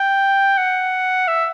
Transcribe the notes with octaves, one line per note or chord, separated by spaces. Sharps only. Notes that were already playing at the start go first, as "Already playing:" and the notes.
Already playing: G5
F#5
E5